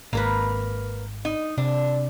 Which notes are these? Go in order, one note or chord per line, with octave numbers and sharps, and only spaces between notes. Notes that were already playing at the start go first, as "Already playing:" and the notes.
G#1 A#3 A#4 B4
D#4
C3 D4